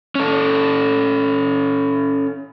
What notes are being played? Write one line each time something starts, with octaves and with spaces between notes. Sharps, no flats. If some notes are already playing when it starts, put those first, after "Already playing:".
C#4 A4